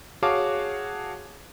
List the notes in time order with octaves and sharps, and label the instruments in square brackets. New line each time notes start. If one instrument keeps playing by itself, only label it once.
[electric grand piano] F#4 G#4 C#5 F5 A5 D6